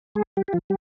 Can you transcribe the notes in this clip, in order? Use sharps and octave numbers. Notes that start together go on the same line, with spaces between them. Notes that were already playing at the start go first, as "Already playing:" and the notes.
G#3 G#4
G3 G4
G4
F3 F4
G3 G4